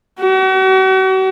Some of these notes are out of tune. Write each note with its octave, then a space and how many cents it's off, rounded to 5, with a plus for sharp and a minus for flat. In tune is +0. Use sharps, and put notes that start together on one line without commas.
F#4 +40